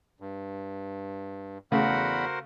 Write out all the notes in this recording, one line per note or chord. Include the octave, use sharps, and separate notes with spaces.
G2
E2 C#3 A3 F#4 A#4 C5 F#5 B5